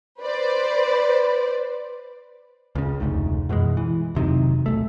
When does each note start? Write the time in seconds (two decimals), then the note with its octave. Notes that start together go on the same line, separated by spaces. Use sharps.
0.20 B4 C5 D5
2.75 C#2 C#3
3.00 F1 D2 G#2
3.49 F#2 B2 E3 G#3
3.77 E3
4.15 F1 C3 D#3 F#3
4.66 B1 F2 A3